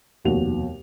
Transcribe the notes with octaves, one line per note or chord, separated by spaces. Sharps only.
F1 D#2 B2 F#4 F7